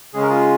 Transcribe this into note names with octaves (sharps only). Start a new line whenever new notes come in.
C#3 G#3 C#4 G#4
A#4
F4 G#4